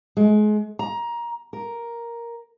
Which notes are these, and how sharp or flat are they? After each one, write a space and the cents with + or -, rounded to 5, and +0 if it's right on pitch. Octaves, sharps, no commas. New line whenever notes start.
G#3 +30
A#5 +20
A#4 +5